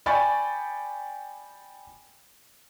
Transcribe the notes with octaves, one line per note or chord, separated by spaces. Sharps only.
D5 G5 G#5 B5 C#6 A6